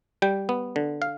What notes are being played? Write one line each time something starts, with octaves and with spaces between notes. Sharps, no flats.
G3 G5
B3
D3
F5